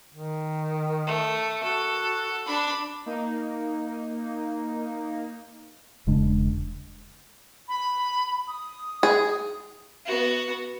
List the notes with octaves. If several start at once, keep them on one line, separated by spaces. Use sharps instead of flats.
D#3
A3
F#4 A4
D4 B5
A#3 D#4
E1 C#3 G#3 D4
B5
D#6
G#4
B3 F#4